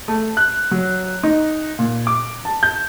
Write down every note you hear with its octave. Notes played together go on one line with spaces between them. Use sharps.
A3
F#6
F#3
D#4
A#2
D6
A5
G6